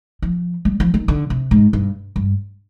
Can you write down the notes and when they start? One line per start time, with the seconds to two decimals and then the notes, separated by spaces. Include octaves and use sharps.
0.22 F3
0.65 G3
0.80 F3
0.94 D#3
1.08 D3
1.30 C3
1.51 G#2
1.73 G2
2.16 G2